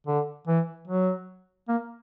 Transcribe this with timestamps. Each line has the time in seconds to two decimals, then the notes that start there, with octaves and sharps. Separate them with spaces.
0.07 D3
0.47 E3
0.87 F#3
1.68 A#3